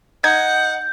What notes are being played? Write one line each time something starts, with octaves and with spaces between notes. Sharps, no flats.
D#4 F#5 G6 G#6